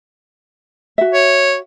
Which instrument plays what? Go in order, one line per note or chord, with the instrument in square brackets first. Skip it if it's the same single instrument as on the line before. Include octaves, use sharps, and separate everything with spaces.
[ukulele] F#4 E5
[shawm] C#5